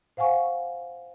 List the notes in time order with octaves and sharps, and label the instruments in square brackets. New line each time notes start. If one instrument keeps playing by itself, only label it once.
[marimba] C5 F5 F#5 G#5 C#6